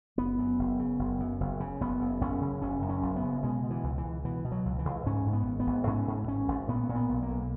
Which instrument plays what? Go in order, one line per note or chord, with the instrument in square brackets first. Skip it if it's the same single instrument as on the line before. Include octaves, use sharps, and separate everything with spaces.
[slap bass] F#1 B3
F#2
F#1
C#3
F#1
F#2
F#1
C#3
F#1 B3
F#2
F#1 C#4
C#3
F#1 C#4
F#2
C#4
F#1
B3
C#3
B2 G#3
B2
E3
C#2
E3
C#2
B2 E3
B2
F#3
C#2
E3
C#2
G#2 C#4
G#2
B3
G#1
B3
G#1
G#2 C#4
G#2
G#1 C#4
G#1
A#2 B3
A#2
B3
B1
A#3
B1